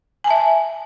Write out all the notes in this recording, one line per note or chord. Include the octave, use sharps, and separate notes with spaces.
E5 G#5 A5